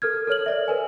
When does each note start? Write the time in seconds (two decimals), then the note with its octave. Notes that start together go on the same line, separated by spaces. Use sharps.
0.02 A4 A#4 F6 G#6
0.27 A4 A#4 C#5 F6 F#7
0.46 C#5 D5 E5
0.68 A#4 B4 G#5